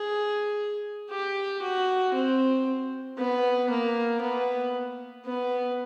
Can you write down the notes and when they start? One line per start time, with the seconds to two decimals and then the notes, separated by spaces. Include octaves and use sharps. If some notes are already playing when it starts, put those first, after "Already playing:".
Already playing: G#4
1.10 G4
1.62 F#4
2.14 C4
3.18 B3
3.70 A#3
4.22 B3
5.25 B3